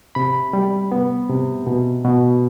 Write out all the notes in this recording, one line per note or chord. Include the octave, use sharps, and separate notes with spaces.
C3 B5
G3
B3
C3
B2
B2